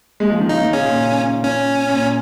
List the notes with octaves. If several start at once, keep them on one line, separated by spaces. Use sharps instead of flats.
G#3
F3
D#3
C#3 D#4
D#3
C#3 C#4
A#2
C#4
A#2